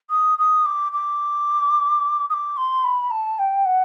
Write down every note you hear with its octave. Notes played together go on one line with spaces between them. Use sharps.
D#6
D#6
D6
D6
D#6
D6
C6
B5
A5
G5
F#5